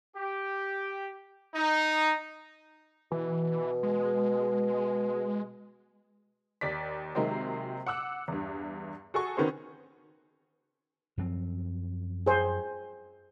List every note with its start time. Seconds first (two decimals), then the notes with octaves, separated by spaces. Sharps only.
0.15 G4
1.55 D#4
3.12 B2 E3
3.83 G#3
6.61 D#2 D5 B6
7.15 C3 D#3 F#3 G#3 A#3 C4
7.87 F#5 D6 E6 F#6
8.28 E2 G2
9.14 F#4 G#4 A4 G#5 C#6
9.37 D#3 B3 C#4 F#4 G#4 C5
11.18 F#2 F3 C4
12.26 G#4 C5 G#5